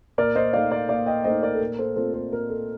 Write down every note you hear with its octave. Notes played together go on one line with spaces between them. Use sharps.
A#2 A#4 D5
C5 D#5
A3 D#4 D5 F5
D5 F5
A#2 D5 F5
D#5 G5
A3 D#4 C5 D#5
A#4 D5
A4
A#2 A#4
A4 C5
A3 C4 F4 A4 C5
A4 C5
A#2 A#4
A4